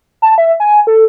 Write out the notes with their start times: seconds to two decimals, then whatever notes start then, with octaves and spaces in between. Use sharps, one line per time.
0.22 A5
0.38 E5
0.60 G#5
0.87 A4